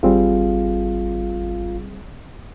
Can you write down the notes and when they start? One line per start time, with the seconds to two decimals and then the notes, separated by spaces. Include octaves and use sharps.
0.03 G#1 G3 C4 F4 G#4 F5